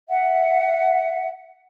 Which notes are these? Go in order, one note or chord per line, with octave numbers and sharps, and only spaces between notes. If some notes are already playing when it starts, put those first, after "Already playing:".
E5 F#5